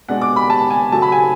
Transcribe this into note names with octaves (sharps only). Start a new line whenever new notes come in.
B2 G#3 D4 F#5
D6
B5
A5
G#5
C#3 F#3 A3 A5
B5
G#5